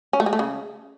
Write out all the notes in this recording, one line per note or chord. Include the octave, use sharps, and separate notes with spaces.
C#4
A3
G#3
A3
C#3